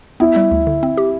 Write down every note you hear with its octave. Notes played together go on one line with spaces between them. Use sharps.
B3 E4
G3
D2
D3
C4
G4